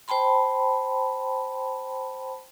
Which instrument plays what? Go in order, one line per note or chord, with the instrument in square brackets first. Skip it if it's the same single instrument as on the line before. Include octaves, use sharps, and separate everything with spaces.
[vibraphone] C5 G5 A5 B5 C6